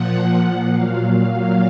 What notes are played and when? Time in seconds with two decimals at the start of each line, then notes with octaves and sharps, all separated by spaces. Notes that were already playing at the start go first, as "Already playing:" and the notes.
Already playing: A#2 F3 F#5
0.72 A#2 F#3 F5